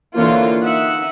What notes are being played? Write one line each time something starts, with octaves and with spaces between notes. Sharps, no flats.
D3 E3 A#3 F4 A#4 C#5
D#4 E5 F#5